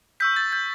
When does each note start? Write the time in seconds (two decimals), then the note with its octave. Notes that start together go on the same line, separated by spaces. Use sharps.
0.20 C#6 E6 G6 B6
0.36 A6
0.52 G6